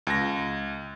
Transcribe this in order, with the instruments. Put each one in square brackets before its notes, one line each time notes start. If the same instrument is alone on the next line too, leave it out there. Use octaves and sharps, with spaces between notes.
[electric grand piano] C#2 A#6